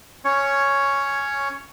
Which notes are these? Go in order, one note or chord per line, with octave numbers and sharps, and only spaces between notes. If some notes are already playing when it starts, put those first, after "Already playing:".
C#4 C#5